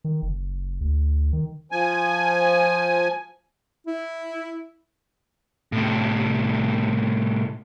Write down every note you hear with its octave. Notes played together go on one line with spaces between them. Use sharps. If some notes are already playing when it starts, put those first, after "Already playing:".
D#3
F#1
D2
D#3
F3 G#5
E4
A2 C3